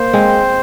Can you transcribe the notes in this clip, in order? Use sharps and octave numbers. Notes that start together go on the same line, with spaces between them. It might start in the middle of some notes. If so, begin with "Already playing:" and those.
Already playing: A#3 C5
G#3 C4